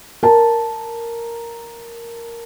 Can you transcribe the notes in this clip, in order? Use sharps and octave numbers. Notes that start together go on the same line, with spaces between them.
A#4 A5